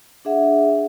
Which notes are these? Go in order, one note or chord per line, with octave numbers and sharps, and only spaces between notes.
D4 G#4 E5 F#5